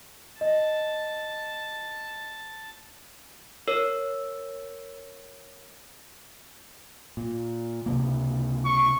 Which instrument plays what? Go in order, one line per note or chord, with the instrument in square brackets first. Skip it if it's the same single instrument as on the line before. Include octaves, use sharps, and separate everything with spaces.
[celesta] D#5 [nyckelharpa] A5
[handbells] A#4 C#5 E6
[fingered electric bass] A#2
C#2 C3 A#3
[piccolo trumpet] C#6